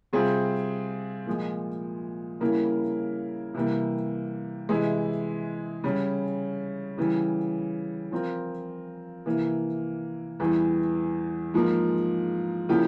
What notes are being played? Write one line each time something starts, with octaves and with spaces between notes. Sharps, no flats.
C3 G3 C4 F4 G#4
A#2 F3 G#3
C#3 G3 A#3 E4 A#4
C3 E3 G3 A#3
C3 E3 G#3 E4
C#3 G3 C#4
C#3 E3 G3
F3 C4 F4 A#4
C3 E3 A#3
E2 E3 G3
G#2 F3 A#3
C#3 F3 A#3 E4 G4